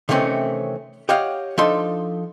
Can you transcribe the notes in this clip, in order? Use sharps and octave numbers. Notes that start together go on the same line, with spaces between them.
C3 D#3 E3 A3 C4 C#4
G4 C#5 D#5 F5 F#5
F3 D4 D#4 A4 C6